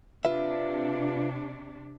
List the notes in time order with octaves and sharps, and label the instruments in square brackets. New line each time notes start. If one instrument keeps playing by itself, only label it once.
[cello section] C3 D4 [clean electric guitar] F4 B4 E5